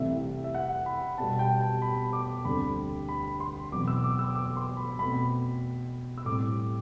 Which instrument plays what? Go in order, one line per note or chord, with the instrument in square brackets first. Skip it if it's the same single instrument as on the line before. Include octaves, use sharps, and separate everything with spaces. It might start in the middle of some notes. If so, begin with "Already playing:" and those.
Already playing: [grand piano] C2 C3 E3 A3 C4 E5
E5
F#5
B5
B2 G3 B3 A5
G5
A5
B5
D6
D2 D3 G3 C4 B5
B5
C6
E2 B2 F#3 C4 D6
E6
D6
E6
D6
C6
B5
B2 A3 C4 B5
E6
A2 G3 C4 D6